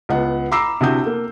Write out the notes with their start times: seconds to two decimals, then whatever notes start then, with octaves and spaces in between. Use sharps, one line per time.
0.09 C#2 B3 F#5
0.52 A#5 B5 D6 E6 C7
0.81 C3 D4 E4 F#4 D#6 G6
1.06 A#3